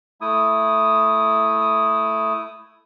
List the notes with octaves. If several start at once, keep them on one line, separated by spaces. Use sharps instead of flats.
A3 E4 D#6